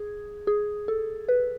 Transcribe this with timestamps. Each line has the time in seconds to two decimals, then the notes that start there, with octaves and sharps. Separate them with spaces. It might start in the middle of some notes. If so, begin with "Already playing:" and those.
Already playing: G#4
0.47 G#4
0.88 A4
1.29 B4